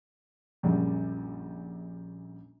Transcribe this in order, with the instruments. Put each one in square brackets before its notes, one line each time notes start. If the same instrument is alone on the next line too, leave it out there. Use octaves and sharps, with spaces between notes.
[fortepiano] A#1 F#2 C#3 G3